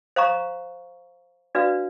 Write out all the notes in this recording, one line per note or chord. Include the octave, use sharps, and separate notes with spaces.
C5 F5 A#5 C#6
D4 F#4 B4 D5 F5